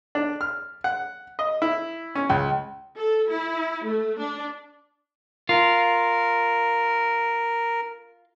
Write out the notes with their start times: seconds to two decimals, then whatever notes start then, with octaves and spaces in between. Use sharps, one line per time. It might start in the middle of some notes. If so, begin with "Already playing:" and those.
0.15 D4
0.41 F6
0.84 F#5
1.39 D#5
1.62 E4
2.15 C#4
2.29 C#2
2.98 A4
3.30 E4
3.85 A3
4.20 D4
5.49 F4 A#4